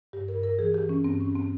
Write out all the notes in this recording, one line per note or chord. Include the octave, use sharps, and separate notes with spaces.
G2 G4
A#4
G2
A#4
E3 G#4
G4
E3
C#4
G2 C4
C#4
G2
C4